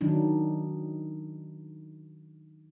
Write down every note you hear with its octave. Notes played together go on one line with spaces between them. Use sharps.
D#3 F#3 D4 D#4